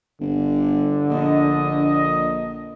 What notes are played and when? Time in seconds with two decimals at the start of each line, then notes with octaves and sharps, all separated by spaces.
0.20 G1 D3
1.10 A#1 D#5